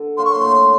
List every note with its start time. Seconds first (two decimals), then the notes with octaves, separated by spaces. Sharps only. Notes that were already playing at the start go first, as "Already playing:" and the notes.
Already playing: D3
0.17 F#3 A#3 C6
0.25 C#6
0.33 C6
0.41 A2